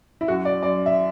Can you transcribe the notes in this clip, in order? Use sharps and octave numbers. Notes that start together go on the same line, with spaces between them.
E4
F#2 F#4
D5
F#2 D5
E5